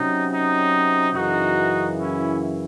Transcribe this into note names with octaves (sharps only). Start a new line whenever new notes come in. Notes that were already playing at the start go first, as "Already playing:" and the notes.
Already playing: C3 F#3 C#4 D#4
D#4
F#2 C#3 E3 D#4 F#4
C#4 E4